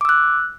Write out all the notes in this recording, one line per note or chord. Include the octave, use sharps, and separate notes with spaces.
D6 E6 F#6